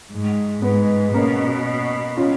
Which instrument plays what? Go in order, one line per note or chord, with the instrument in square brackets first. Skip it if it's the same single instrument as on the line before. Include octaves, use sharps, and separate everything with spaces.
[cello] G#2
[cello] G#2 [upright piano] B3
[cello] B2 [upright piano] A#3 C#4
[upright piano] C#4 F4